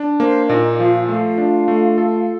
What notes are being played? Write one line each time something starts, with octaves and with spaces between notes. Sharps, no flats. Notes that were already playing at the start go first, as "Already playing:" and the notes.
Already playing: D4
A#3 C5
A#2 D#4 D#5
F3 F4 F5
A3 F4 F5
D4
A3
A4